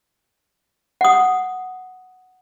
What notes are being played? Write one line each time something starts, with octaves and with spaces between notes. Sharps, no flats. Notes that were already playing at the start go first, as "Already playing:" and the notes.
F#5 D#6